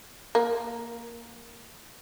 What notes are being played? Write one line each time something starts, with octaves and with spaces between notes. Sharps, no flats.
A#3